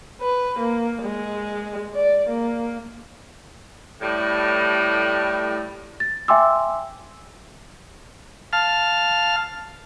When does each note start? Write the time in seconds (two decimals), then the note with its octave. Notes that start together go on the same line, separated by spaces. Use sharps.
0.21 B4
0.59 A#3
1.03 G#3
1.95 D5
2.29 A#3
4.01 A2 G3
6.00 A6
6.28 E5 G5 G#5 C6 D6 E6
8.53 F5 A5 F6